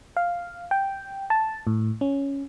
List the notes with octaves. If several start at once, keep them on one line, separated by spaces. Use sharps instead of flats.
F5
G5
A5
A2
C#4